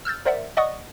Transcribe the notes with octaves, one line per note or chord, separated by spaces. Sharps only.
E6 F6 G6 A6
A#4 C5 D5 E5 F#5
D5 D#5 F#5 C#6 D#6